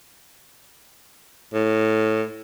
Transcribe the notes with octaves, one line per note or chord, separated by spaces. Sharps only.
A2